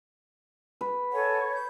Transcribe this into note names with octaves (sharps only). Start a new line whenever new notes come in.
B4
A4 C#5 F#5 G#5
G6